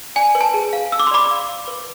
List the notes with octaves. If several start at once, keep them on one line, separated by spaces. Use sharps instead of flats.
D5 G#5
B4
A5
G#4
F5
F5 E6
D6
C6
D5 B5 D6
F5
F5
B4